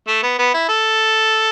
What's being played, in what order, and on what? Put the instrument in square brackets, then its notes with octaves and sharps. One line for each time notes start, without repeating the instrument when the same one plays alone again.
[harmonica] A3
B3
B3
E4
A4